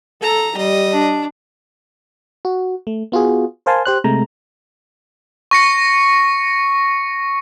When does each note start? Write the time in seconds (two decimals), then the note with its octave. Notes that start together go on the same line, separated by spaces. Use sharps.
0.22 A4 A#5
0.57 G3 D#5
0.93 D4
2.45 F#4
2.87 A3
3.12 B3 F4 F#4 G#4
3.66 A#4 C5 F5 G#5 A5 C6
3.85 G4 C5 F#6
4.04 C3 G#3 A3 A#5
5.51 C#6 A#6 C#7